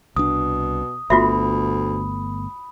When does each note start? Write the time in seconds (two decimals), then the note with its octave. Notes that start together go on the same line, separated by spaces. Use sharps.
0.16 C2 B2 D4 D#6
1.10 G1 D2 A3 B3 F4 F#4 E5 B5